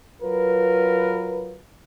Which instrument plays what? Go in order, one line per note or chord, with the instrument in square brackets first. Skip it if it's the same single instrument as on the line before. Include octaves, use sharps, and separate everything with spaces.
[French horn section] F#3 F4 A#4 B4